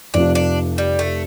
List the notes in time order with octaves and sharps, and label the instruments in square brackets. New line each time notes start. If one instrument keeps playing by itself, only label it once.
[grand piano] F1 F2 C3 F3 [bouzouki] D4
[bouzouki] D4
G3
A3